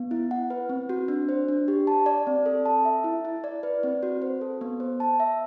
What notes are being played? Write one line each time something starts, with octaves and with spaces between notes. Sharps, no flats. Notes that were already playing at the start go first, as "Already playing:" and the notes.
Already playing: B3
E4
F#5
B4
C4
F#4
D4
C5
D4
G4
A5
D5
C4
A4
A5
E5
E4
E4
D5
B4
C4
F#4
C5
A4
B3
C5
A5
E5